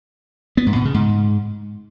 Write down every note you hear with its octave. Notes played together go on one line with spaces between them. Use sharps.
B3
G#2
B2
C#3
G#2